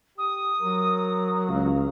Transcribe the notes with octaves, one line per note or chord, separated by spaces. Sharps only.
G4 D#6
F#3 A#4
C#2 F5